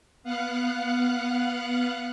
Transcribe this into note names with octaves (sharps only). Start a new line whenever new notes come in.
B3 F5 F#5 F#6